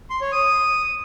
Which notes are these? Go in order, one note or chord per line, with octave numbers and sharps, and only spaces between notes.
C6
C#5
D#6